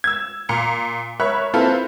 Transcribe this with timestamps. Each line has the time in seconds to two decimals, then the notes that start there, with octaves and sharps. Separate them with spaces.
0.04 E6 G#6
0.49 A#2 A#5 C#7
1.20 A#4 C#5 E5 B5 C#6 F#6
1.54 A#3 C4 E4 F4 A4 B4